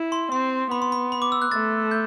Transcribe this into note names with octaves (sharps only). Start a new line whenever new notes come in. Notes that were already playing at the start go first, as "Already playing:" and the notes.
Already playing: E4
C6
C4 C6
B3 B5
C6
B5
B5
D6
E6
F#6
A3 A6
G6